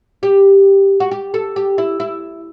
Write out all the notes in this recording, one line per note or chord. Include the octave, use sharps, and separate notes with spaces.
G4
F#4
G4
A4
G4
E4
E4